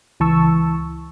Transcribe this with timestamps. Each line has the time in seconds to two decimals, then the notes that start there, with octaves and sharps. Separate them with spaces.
0.20 C#2 E3 A5 C#6 E6